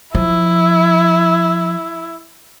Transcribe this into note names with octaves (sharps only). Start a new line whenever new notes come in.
F3 E4